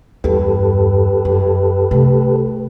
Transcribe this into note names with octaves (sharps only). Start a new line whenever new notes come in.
E2 G2 G4 A4 B4
F#2
C3 A3